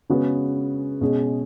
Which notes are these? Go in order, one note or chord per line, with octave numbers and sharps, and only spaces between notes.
C#3 G#3 B3 F#4 B4
B2 G#3 C#4 G#4